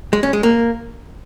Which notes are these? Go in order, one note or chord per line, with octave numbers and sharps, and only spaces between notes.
G#3
C#4
G#3
A#3